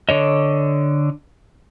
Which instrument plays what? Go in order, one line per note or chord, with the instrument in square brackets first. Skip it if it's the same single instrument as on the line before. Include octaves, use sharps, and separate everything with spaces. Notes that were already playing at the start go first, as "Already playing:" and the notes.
[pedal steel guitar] D3 C#5 D#5